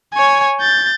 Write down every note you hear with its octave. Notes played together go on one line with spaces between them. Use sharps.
C#5 G#5
G6 A6